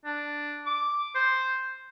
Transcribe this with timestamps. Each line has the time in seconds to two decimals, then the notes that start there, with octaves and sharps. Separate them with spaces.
0.05 D4
0.66 D6
1.15 C5